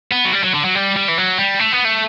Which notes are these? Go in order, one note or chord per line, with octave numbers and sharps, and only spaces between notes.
B3
F#3
G3
F#3
D3
F#3
G3
G3
E3
F#3
G3
A3
B3
A3